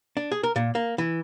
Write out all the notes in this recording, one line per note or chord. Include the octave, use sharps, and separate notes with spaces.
D4
G#4
A#4
A#2
A#3
E3